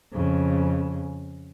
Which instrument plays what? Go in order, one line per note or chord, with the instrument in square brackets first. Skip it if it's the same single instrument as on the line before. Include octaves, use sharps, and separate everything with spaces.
[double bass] F2 C#3